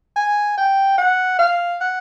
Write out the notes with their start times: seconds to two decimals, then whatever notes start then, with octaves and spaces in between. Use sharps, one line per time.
0.17 G#5
0.58 G5
0.98 F#5
1.39 F5
1.81 F#5